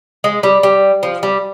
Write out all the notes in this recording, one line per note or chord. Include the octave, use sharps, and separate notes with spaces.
G#3
G3
G3
F3
G3